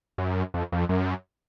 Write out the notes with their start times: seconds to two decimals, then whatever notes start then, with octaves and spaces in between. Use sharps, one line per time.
0.18 F#2
0.54 F2
0.72 F2
0.89 F#2